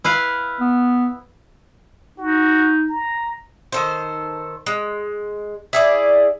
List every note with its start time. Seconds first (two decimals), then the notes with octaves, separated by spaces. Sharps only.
0.04 E4 B4 F5
0.60 B3
2.18 D#4 F#4
2.89 A#5
3.72 D#3 A4 C5
4.66 G#3
5.73 E4 G#4 D5